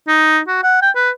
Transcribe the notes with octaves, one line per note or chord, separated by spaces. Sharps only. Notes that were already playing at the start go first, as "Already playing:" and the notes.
D#4
F#4
F#5
G5
B4